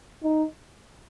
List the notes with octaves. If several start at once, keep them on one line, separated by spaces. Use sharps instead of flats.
D#4